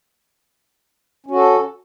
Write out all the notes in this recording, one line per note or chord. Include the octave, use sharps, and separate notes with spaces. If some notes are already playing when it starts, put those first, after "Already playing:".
C#4 F#4 A4